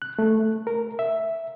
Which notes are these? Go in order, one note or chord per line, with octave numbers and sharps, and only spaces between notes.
F#6
A3
A#4
E5